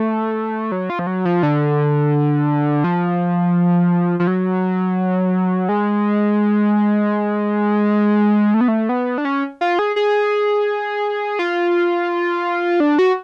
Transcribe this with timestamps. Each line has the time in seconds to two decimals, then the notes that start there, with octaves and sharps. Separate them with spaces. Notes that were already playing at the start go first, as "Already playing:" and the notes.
Already playing: A3
0.72 F#3
0.90 F4
0.99 F3
1.07 F#3
1.25 F3
1.43 D3
2.84 F3
4.20 F3
4.27 F#3
5.69 G#3
8.54 A3
8.61 B3
8.68 A3
8.89 B3
9.18 D4
9.25 C#4
9.61 F4
9.79 G#4
9.96 G#4
11.39 F4
12.80 D4
12.99 F#4